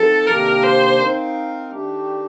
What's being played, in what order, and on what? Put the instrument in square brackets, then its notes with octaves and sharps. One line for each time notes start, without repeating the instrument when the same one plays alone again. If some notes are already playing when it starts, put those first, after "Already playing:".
Already playing: [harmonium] F3 C4 D#4 [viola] A4
[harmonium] C3 D#3 A#3 D4 G4 [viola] A#4
[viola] C5
[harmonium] C4 D#4 A#4 F5
D#3 A3 D4 G4